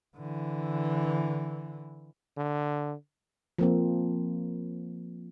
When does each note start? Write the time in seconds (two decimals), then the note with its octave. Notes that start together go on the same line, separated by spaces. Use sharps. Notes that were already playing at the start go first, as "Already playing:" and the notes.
0.17 D3 E3
2.37 D3
3.58 F3 A#3 C4